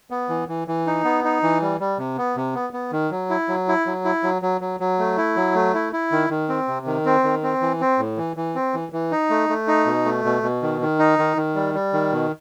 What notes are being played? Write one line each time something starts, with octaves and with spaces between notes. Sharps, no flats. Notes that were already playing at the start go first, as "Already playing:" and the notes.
B3
E3
E3
E3
D#4
B3
D#4
E3
G3
G3
C3
B3
C3
B3
B3
D#3
F#3
E4
F#3
E4
F#3
E4
F#3
F#3
F#3
F#3
A3
E4
F#3
A3
E4
E4
D#3
D#3
C4
C3
D#3
C4
D#3
C4
E3
C4
A2
E3
E3
C4
E3
E3
D#4
A3
A3
D#4
B2
A3
B2
B2
D#3
D#3
D#4
D#3
D#3
G3
G3
D#3
B2